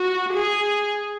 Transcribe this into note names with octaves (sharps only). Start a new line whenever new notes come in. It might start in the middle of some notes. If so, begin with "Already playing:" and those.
Already playing: F#4
G#4